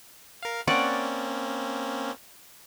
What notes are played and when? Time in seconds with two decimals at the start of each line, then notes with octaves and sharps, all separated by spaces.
0.43 A#4 F5
0.67 A#3 C4 C#4 D5 F#5 C#6